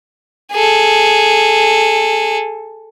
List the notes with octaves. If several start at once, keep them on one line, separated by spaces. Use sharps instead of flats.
G#4 A4